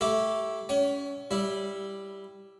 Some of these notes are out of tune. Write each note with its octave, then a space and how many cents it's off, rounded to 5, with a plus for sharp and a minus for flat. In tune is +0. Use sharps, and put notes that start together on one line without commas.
A3 +0 E4 +0 G4 -15
C#4 +25 G5 -45
G3 +0 E4 +0